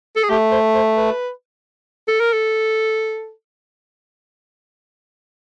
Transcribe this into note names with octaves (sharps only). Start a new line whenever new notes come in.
A4
G#4
A3 G4
C5
C5
B4
A4
A#4
A4